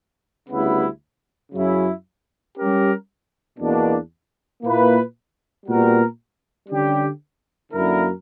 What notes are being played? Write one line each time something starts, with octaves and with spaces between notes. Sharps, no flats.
D2 C#3 G3 B3 E4
F#2 C#3 F#3 C#4 E4
G3 C#4 G4 A#4
E2 B2 A#3 D4
A#2 A#3 E4 B4
A#2 G3 B3 F#4 A#4
D3 G3 C#4 G4
F#2 D3 A#3 E4 A#4